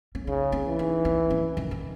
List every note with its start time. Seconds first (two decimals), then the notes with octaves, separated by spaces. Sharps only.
0.15 C#4
0.27 C#3 D#4
0.52 C#4
0.65 E3
0.79 D#4
1.05 C#4
1.30 C#4
1.57 D#3
1.71 D#3